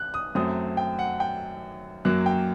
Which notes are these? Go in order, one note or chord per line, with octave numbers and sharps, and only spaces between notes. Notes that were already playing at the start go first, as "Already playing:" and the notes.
Already playing: F#6
D#6
F#2 F#3 A3 C4 D#6
G5
F#5
G5
F#2 F#3 A#3 F#6
G5